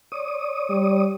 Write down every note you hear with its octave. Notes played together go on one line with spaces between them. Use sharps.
C#5 D5 D#6
G3